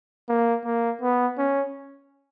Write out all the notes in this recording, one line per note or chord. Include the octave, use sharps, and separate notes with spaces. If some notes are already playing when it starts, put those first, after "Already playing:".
A#3
A#3
B3
C#4